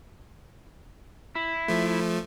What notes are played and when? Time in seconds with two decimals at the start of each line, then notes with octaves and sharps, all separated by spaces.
1.35 E4
1.68 F3 A3